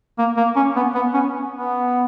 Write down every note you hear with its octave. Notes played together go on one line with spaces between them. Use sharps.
A#3
A#3
C#4
B3
B3
C#4
B3